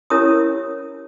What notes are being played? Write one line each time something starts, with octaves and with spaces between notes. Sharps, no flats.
C#4 E4 G4 A#4 C#5 D#6